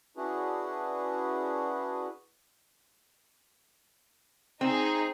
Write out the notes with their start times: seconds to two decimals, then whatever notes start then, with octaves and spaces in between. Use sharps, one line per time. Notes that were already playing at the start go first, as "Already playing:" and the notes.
0.17 C#4 D4 E4 F#4 G#4 B4
4.61 C4 D#4 G#4